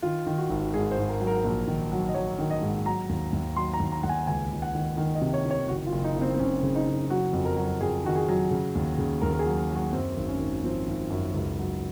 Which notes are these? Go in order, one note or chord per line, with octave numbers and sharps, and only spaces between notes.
D#3 F4
D#3
F#4
G#1
G#2 G#4
C5
G#2
A#4
F#3
A#4
A#1
D#3
F#3
D#5
F#3 C#5
D#3
D#5
G#2
F#3 A#5
D#2
D#2
F#3 C6
A#5
D#2
A#5
D#2 F#5
G#5
C#2 G#5
C#2
F#5
D#3
D#3
D#5
C3
C#5
D#3
C#5
F#1 F#4
F4
F#1
D#4
F#1
C4
C4
F#1 C#4
C#3
D#4
F#1
F#3 F#4
F2
A#4
F#3
F2 G#4
D#3 F#4
G#4
F#3
C#3
D#2
C#3
D#2 A#4
A#4
G#4
F#3
F#3
F#4
F#2 C4
G#1
C#4
G#1
F3 C4
G#1
F#2
C#2
F#3